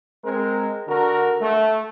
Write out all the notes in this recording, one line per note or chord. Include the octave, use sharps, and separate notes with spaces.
G#3 C4 A#4
D3 F#4 A#4
A3